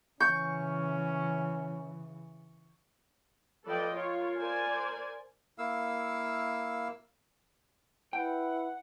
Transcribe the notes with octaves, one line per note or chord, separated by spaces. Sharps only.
C#3 E3 C#4 C#6 G6
F3 A4 B4 D5 D#5 G5
F4 A#4 C#5
A#4 C5 D5 G#5
A#3 E4 F5 E6
E4 B4 F#5 G5